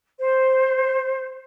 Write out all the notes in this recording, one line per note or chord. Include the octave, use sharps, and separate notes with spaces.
C5